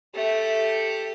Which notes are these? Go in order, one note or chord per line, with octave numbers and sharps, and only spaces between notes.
A3 G4